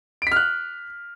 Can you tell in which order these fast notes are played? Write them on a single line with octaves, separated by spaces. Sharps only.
D7 B6 F6 F#6